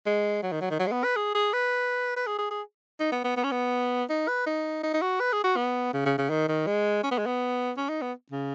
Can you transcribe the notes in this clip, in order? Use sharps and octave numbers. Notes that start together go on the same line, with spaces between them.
G#3
F#3
D#3
F#3
D#3
F#3
G#3
B3
B4
G#4
G#4
B4
B4
G#4
G#4
G#4
D#4
B3
B3
B3
C#4
B3
D#4
B4
D#4
D#4
D#4
F#4
B4
G#4
F#4
B3
C#3
C#3
C#3
D#3
D#3
G#3
C#4
B3
G#3
B3
C#4
D#4
B3
C#3